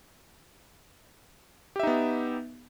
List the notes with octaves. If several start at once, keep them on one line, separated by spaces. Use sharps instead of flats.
B3 D#4 G4 E5